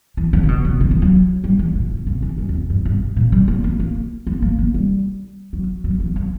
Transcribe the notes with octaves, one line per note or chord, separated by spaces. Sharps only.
E3
D3
C#3
B2
C#3
D3
E3
F#3
G3
E3
A#2
B2
C#3
E3
F#2
E2
F#2
G2
A#2
G3
A#3
A#3
A#3
B3
A#3
A#3
G3
F#3
F#3
E3
F#3